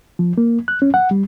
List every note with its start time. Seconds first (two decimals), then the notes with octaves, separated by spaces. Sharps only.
0.19 F3
0.38 A#3
0.68 F#6
0.82 C#4
0.94 F#5
1.11 G3